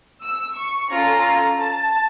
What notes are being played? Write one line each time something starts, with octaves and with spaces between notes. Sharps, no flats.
E6
C#6
C#4 F4 A4 A#5
A5